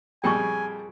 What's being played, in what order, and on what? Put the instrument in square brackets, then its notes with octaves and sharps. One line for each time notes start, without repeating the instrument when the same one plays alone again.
[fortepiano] F2 A#2 G3 [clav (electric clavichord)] G#4 [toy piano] G5 C#6 [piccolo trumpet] G#5